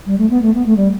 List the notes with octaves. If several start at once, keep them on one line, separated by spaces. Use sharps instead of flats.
G3
A3
B3
A3
B3
A3
G3